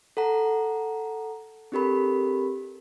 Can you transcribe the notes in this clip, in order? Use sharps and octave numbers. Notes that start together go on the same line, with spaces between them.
A4 F#5 A#5
C4 D4 G4 A4 A#4 B5